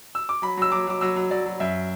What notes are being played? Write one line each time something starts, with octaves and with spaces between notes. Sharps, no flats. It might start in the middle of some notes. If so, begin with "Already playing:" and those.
E6
D6
F#3 B5
F#3 E6
F#3 D6
F#3 D6
F#3 E6
F#3
F#3 D5
F#3
F#2 E5